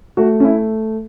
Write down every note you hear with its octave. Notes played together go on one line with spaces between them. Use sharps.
A3 F#4
C#4
E4